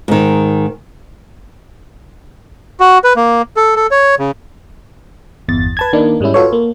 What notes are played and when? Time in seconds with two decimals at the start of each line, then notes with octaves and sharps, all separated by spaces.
0.08 G#2 D#3
2.80 F#4
3.04 B4
3.16 A#3
3.57 A4
3.76 A4
3.91 C#5
4.19 C#3
5.48 G1 E2 A6
5.77 B4 A5 G#6
5.93 D#3 A#3 D4 D#4
6.21 G#2 G3 G#3 C#4 E4
6.34 F4 F#4 A4 B4 C#5
6.53 A#3